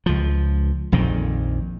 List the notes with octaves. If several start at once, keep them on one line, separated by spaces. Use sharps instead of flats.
C#2 F3
A#1 F2 A#2 D#3